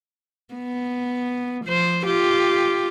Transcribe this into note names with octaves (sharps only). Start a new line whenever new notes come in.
B3
F3 C5
F4 G4